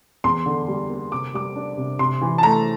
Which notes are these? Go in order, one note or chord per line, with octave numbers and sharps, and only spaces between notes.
E2 C6
D3
G3
A#3
C3 D6
G3 D6
D4
C3
C3 C6
E3
A5
A3 A#5